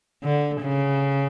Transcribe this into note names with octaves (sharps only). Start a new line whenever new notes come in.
D3
C#3